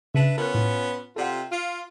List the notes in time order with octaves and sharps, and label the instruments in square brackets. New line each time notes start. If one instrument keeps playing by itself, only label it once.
[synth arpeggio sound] C#3 [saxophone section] D4 B4 E5
[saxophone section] B3 C#4 F4 [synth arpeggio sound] A#4 F#6
[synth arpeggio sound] A2
[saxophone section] C3 F4 [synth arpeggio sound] A4 D5 F#5
[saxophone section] F4